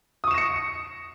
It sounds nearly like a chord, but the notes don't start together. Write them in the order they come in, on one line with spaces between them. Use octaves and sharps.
D#6 C#6 E7 A#6 C#7